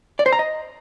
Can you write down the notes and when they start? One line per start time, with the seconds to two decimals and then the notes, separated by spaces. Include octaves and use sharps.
0.19 D5
0.26 C5
0.33 A#5
0.39 D#5